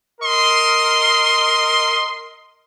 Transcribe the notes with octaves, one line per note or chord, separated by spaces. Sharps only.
A#4 D#5 C6